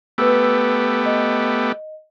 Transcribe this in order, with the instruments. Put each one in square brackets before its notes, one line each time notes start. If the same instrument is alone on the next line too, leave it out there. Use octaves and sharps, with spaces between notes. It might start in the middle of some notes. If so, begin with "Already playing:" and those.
[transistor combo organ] A3 B3 G4 [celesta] B4 E6
[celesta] D#5